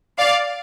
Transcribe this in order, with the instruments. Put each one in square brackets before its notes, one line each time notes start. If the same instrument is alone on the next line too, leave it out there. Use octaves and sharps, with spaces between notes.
[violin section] D5 F5